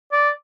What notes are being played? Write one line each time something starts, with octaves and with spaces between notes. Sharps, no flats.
D5